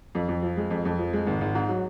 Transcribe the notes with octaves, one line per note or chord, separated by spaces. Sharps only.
F2
F2
F3
G#3
F2
F2
F3
G#3
G#1
G#1
G#2
F#3